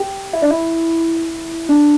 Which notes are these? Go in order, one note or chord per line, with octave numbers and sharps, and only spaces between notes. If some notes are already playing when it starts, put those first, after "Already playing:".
Already playing: G4
E4
D4
E4
D4